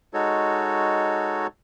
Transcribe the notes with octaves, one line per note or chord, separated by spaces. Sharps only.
G#3 D#4 F#4 A4 C#5